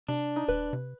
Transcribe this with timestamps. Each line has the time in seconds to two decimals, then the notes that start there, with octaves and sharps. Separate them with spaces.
0.08 C3 D4
0.36 D#4
0.48 D#1 B4
0.73 C3